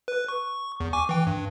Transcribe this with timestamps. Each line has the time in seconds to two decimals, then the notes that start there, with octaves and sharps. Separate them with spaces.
0.08 B4
0.28 C#6
0.80 E2
0.93 G#5 C#6 D6
1.09 E3 G5
1.27 G2